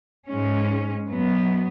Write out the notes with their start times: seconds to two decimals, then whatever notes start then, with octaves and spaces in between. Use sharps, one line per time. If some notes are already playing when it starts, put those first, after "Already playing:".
0.29 G#2 G#3 C#4
1.08 F#2 F#3 B3